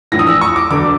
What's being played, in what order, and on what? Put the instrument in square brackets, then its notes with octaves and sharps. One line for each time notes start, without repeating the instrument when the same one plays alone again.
[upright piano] A#1 A2 E3 A#6
D#6
E6
C#6
D6
E1 D2 D3 D6